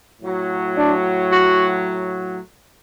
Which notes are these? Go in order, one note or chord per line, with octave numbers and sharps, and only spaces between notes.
A2 F#3
D4
F#4